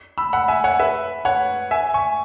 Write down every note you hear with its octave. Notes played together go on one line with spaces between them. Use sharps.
B5 E6
F#5 B5
E5 G#5
C#5 F#5
B4 E5
C#5 F#5
E5 G#5
G#5 C#6